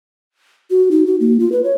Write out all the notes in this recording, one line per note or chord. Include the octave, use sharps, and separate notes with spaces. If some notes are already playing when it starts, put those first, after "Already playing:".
F#4
D#4
F#4
A#3
F4
B4
C#5